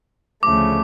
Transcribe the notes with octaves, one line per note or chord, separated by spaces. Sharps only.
D2 C#3 F3 A3 D6